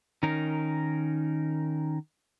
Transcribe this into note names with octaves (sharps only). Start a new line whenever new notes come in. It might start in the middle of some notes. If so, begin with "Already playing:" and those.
D#3 C#4 D#4 A#4